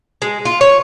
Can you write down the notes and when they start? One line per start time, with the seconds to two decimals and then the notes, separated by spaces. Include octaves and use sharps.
0.22 G#3
0.45 F4
0.61 C#5